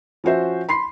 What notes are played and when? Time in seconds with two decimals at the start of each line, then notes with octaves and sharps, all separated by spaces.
0.24 F3 C#4 F#4 C5 E5
0.68 B5 C6 C7